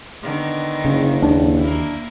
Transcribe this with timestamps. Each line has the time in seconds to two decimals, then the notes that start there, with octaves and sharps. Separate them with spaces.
0.23 D3 D#3 B3
0.85 F#1 C#3
1.22 D#2 D4
1.58 A#3 E4